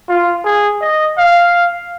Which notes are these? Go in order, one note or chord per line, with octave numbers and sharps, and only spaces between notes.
F4
G#4
D#5
F5